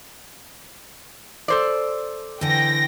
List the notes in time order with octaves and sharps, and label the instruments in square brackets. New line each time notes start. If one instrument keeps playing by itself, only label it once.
[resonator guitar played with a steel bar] A4 C5 D5
[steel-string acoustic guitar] D3 E3 [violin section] G5 A#6